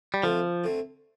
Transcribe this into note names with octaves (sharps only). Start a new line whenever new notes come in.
G3
D2 D3 F3 A3 C4
D2 D3 A3 C4